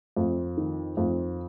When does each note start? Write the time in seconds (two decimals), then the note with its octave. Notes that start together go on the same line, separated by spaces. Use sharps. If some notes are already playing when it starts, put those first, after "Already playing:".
0.16 F2
0.57 D#3
0.97 F2